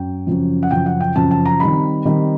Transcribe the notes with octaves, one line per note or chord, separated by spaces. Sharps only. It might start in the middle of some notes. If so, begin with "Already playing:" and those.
Already playing: F#2 G5
F#2 C#3 F3
F#5
F#2 C#3 F3 G5
F#5
G5
F#2 C#3 F3 A5
A5
A#5
D#3 G3 C4 D#4 B5
D#3 G3 C4 D#4